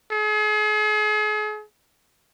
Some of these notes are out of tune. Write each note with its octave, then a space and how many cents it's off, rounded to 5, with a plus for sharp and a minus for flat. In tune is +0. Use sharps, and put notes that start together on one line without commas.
G#4 +40